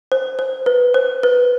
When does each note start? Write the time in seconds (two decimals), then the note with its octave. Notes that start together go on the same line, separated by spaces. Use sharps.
0.12 C5
0.39 C5
0.66 B4
0.94 C5
1.23 B4